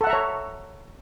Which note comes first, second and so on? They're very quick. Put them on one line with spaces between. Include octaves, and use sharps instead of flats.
A4 F#5 E5 A#5 C#5